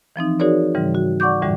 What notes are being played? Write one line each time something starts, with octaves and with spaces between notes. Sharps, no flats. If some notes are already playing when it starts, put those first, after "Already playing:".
E3 F3 C4 D#4
D#4 F#4 G#4 A#4 C#5 D5
G#2 C#3 E3 G3
F#4
D5 F#5 C#6 D6 G6
F2 A2 D3 E3 G3